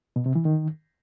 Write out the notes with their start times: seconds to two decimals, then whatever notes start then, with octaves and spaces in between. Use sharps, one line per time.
0.16 B2
0.26 C3
0.35 E3
0.45 D#3